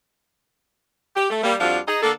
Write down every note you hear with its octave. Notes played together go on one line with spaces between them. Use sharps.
G4
A3
G3 A#3
F2 F3 G3 D4 F#4 F5
D#4 G#4 D#5
D3 A#3 D4 A4